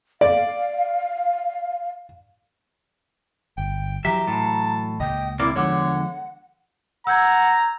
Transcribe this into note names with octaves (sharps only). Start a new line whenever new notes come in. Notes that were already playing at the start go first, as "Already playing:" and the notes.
D5 F5
G1 G5
E3 F#3 G4 E5 A#5
A2 A5
C#2 A#2 D#5 G5
C3 A#3 E4 D5
E2 D3 F3 G#3 C#5 F#5
F#5 A#5 E6 G6 G#6